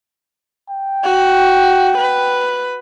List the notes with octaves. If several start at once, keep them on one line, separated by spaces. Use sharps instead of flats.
G5
F#4
B4